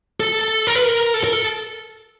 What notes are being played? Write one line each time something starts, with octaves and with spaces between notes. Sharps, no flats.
A4
A#4
B4
A#4
A4
A#4
A4